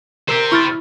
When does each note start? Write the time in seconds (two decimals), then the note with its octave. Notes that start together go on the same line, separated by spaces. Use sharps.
0.29 G4 A#4 C5 E6
0.52 E4 C#6 F6 A6